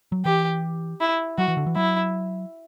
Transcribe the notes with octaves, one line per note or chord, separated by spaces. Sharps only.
F#3
E3 G4
E4
F#3 F#4
E3
D3
E3
F#3 E4